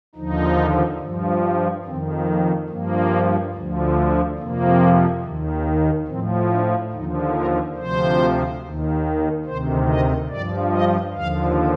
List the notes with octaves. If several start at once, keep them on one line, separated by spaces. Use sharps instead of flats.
D#2 D3 F3 D#4
G2 F3
F2 D#3 C4
A#3
G2 F3 A#3
D2 D3 F3
F2 C3 F3 A#3
D#2 D#3
A2 F3 C4
D4
D#2 D3 F3 D#4
A#4
D2 C3 F3 C5
D#2 D#3
D2 C3 D#3 C5
D#5
G2 F3 D5
D#5
D#2 D3 F3 F5